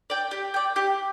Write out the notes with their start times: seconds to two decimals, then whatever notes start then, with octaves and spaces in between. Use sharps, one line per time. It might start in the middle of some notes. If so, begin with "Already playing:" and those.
0.10 D5 G5
0.31 G4
0.54 D5 G5
0.76 G4